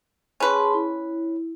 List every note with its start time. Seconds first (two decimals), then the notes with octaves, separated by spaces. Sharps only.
0.40 C#4 G#4 B4 A5 C6
0.74 E4